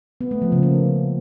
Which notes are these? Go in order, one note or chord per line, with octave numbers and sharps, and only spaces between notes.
B3
A3
F3
C#3
A#3